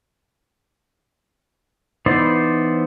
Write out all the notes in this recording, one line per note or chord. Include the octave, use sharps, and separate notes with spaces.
E3 B3 D#4 C5 D5